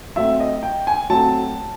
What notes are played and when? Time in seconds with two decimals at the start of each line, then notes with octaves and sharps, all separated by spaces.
0.16 F#3 A3 C4 E5
0.40 D#5
0.63 G5
0.87 G#5
1.10 F#3 A3 C4 A5